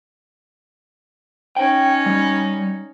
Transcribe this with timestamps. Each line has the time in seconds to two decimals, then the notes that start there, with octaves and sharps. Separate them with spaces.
1.56 C#4 D#4 G5
2.06 G3